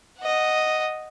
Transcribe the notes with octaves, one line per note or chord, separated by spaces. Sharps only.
D#5 F#5